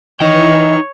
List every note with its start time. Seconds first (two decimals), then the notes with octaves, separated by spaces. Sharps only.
0.20 E3 D#4 C#5 D#5 G5